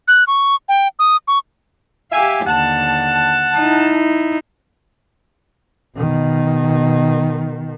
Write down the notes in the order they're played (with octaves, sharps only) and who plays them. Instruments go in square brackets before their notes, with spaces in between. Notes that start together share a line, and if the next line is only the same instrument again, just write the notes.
[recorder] F#6
C#6
G5
D#6
C#6
[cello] G4 F5 [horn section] E5 G#5
[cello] D#2 D3 [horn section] F#5 A5
[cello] D#4 E4
[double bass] B2 D#3